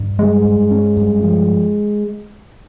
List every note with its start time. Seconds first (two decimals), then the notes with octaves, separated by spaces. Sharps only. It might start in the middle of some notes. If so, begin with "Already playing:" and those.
Already playing: G2
0.19 G3 G#3
0.45 G2
0.71 C#4
0.97 G2
1.23 F3